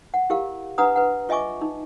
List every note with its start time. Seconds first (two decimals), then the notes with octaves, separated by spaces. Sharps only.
0.14 F#5
0.30 E4 G4 A#4 F5
0.78 D4 B4 F#5 A#5 D#6
0.96 B4 F#5
1.29 F4 D#5 E5 G#5 C#6 D6
1.61 D#4